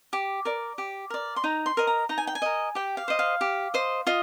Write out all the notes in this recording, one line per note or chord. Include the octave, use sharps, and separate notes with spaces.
G4
A#4 D5
G4
A#4 D5
C6
D#4 A#5
C6
A#4 D#5
A#5
D#4 A#5
G#5
G5
G#5
A#4 D#5
G4 G5
F5
C5 D#5
F5
G4
C5 D#5
F4 D#5